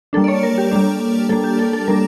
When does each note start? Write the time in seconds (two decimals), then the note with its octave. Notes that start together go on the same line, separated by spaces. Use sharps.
0.13 G3 A#3 D4 A4
0.24 D5
0.28 C#5
0.43 A#4
0.58 G4
0.72 G3 A#3 D4
1.29 G3 A#3 D4 A4
1.44 G4
1.59 A4
1.73 A4
1.88 G3 A#3 D4 A#4